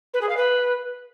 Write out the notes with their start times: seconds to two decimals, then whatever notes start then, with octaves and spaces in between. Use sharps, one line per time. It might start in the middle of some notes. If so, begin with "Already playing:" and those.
0.13 B4
0.21 G#4
0.29 F5
0.36 B4